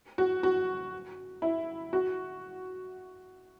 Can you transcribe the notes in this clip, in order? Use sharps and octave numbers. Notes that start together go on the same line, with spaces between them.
F#4
F#4
E4
F#4